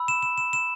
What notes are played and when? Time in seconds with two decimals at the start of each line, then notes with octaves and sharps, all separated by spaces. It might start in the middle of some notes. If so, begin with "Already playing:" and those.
Already playing: B5 E6
0.08 E7
0.23 E7
0.38 E7
0.53 E7